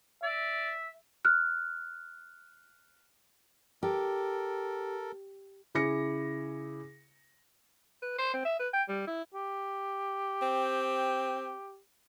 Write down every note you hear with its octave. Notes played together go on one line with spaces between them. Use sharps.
D5 E5
F6 F#6
G4 A4 A#4
C#3 E4 G#4 D6 A#6 C#7
B4
C5
C4
E5
B4
G5
G3
E4
G4
C4